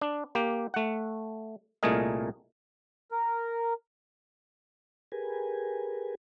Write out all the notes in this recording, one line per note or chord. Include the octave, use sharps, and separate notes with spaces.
D4
A#3 G4
A3 F#5
C2 A#2 A3 G#4 A#4 D#5
A#4
G4 G#4 A#4 B4 G#5